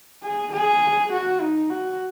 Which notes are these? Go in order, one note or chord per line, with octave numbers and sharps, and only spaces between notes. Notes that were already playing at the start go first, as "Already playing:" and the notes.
G#4
G#4
F#4
D#4
F#4